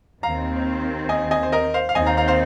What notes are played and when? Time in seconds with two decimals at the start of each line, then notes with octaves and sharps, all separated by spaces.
0.23 D#2 D#3 C4 F5 A#5
1.09 D#5 G#5
1.31 D#5 G#5
1.43 C5
1.52 A#4 D#5
1.74 C5 F5
1.89 F5
1.95 D#2 D#3 C4 D#4 D#5 G#5
2.06 F5 A#5
2.17 F5 A#5
2.28 C5 F5